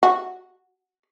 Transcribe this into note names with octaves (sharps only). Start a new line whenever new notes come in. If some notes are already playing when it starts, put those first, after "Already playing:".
F#4